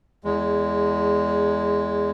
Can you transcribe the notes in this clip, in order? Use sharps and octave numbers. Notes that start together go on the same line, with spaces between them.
E2 G#3